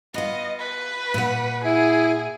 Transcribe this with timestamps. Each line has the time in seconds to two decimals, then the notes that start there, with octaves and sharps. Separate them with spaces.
0.14 B3 F4 D#5
0.60 B4
1.14 A#2 F#5
1.64 E4 G#4